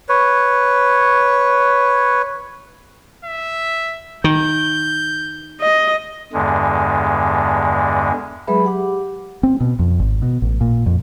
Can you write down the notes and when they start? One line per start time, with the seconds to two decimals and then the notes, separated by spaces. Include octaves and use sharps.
0.09 B4 C#5
3.25 E5
4.24 D#3 G6
5.61 D#5
6.33 E2 G2 D3 G#3
8.47 F#3 G#3 G#4 B4 E5 B5
8.65 G4 F#5 D6
9.43 C4
9.60 B2
9.79 F2
10.00 G#1
10.22 B2
10.42 A1
10.61 A#2
10.86 F2